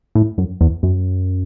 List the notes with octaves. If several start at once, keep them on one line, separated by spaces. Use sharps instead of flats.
A2
F#2
E2
F#2